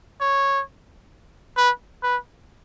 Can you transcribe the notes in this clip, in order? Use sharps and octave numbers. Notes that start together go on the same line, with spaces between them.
C#5
B4
B4